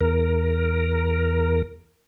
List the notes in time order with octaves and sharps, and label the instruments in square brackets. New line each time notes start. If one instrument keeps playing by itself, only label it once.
[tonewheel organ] E2 A#4